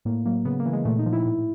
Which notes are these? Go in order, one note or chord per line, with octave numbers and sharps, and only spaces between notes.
A2 A#3
F#3 A#3
C#3 B3
A#3
E3
G#3
A#2 A3
D#4
F3
E4
A2